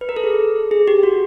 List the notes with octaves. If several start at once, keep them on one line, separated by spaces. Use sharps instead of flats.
B4
A#4
A4
G#4
G#4
G4
F#4